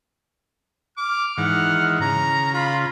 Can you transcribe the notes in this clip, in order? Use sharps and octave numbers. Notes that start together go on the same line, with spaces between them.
D6 F6
G#2 D#3 E3 F#5
C#3 A#5
F4 B5